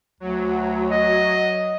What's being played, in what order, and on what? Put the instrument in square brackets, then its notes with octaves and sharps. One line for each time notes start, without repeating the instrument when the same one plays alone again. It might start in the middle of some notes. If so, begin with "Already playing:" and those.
[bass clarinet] D2 [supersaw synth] F#3
[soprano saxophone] D#5